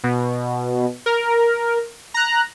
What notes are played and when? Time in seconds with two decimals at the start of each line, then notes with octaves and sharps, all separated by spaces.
0.04 B2
1.06 A#4
2.14 A#5 F#6